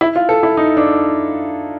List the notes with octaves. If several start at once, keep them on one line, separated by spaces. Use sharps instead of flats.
E4
F4
A4
E4
D#4
D4